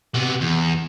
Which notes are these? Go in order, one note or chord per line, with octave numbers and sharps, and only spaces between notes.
C3 B3
E2